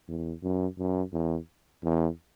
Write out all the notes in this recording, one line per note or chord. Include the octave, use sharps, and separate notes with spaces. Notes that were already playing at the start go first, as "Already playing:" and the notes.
E2
F#2
F#2
E2
E2